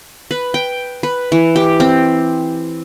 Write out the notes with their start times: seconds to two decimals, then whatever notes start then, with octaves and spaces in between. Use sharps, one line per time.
0.31 B4
0.54 G5
1.03 B4
1.32 E3
1.56 G4
1.80 C4